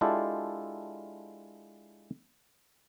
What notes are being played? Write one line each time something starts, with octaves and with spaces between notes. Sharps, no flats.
G#3 D4 E4 F4 G4 A4